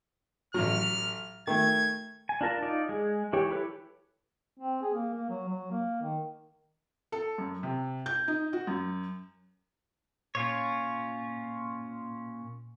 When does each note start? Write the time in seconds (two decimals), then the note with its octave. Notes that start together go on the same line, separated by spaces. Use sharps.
0.54 A1 F#3 F6
1.47 D#3 A3 G#6
2.29 G#5
2.41 D4 F4 A#4 A5
2.62 D#4 F4 D5
2.89 G#3 G#4
3.33 E3 G4 C#5
3.51 E4 G4 A4 B4 C#5
4.59 C4
4.82 G#4
4.94 A#3
5.14 A#3
5.29 F#3
5.48 F#3
5.71 A#3
6.02 D#3
7.12 A4
7.38 F#2
7.63 C3
8.06 G6
8.28 D#4
8.53 F#4
8.67 F#2
10.35 A#2 C#4 F4 C#5